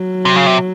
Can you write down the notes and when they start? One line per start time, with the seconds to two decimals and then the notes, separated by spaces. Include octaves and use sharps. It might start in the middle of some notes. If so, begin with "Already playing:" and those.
Already playing: F#3
0.25 C3
0.36 C#3
0.46 C3